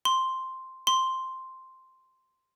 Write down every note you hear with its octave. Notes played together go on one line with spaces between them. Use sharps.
C6
C6